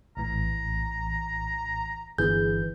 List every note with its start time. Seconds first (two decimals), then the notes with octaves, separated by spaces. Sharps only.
0.17 A#1 A2 E3 A#5
2.18 G1 E3 G#4 G6